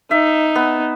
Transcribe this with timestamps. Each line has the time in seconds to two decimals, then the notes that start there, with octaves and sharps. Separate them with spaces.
0.11 D#4 E5
0.55 B3